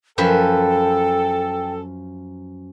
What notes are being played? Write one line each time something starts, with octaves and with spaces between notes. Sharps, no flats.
F#2 F3 A4 B4 G5